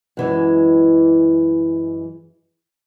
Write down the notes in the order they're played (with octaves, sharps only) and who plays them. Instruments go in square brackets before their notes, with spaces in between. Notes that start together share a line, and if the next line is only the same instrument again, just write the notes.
[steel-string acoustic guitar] F#2 E3 G#3